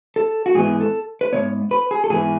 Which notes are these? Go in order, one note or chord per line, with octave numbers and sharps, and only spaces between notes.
A4
F#4
G#2 E3 B3 G#4
A4
B4
G#2 E3 B3 C#5
B4
G#4
A4
G#2 E3 B3 G#4